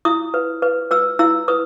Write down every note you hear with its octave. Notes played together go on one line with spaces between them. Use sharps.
E4 D#6
B4
B4
B4 E6
E4 E6
B4 D#6